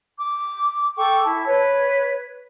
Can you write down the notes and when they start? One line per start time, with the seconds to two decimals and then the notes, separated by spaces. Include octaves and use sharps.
0.19 D6
0.97 A4 G5 C#6 D6
1.25 E4 A5
1.46 B4 C#5